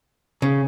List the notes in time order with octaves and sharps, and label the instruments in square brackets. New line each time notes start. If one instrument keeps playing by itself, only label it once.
[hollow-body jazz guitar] C#3